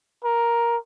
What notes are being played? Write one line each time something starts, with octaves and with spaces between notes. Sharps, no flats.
A#4